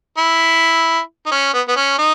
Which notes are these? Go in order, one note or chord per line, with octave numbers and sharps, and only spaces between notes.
E4
D#4
C#4
B3
B3
C#4
D#4